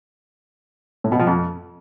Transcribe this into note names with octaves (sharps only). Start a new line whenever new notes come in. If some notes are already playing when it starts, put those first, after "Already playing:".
A2
B2
F3
F2